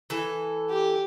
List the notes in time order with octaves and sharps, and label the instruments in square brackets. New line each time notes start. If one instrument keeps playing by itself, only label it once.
[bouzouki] E3 A4
[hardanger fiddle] G4